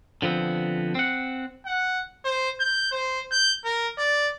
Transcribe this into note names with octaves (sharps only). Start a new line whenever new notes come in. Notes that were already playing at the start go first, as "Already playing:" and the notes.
D3 F3 B3 C4
C4 F#5
F#5
C5
G6
C5
G6
A#4
D5